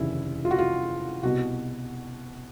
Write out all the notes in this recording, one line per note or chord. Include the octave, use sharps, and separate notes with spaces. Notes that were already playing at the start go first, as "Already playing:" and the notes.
Already playing: F1 D#2 C#3 E3 E4
F4
F#4
F4
C2 B2 F#4